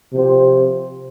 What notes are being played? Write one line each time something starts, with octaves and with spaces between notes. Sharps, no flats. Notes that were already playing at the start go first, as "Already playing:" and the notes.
C3 F3 C4 G4 C5